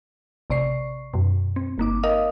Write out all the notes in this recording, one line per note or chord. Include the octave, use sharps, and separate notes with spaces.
A1 C3 D5 C#6 C7
F#2 B2
C4
G1 A#3 D#4 D6
A#4 D#5 F5 D#6